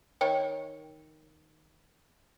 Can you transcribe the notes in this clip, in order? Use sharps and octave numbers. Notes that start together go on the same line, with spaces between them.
D#3 C#5 G5